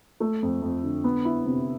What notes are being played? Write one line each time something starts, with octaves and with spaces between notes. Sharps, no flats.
A3
F2
F2
D3
B3
E4
C3